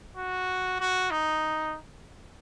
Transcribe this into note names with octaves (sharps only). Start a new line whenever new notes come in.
F#4
F#4
D#4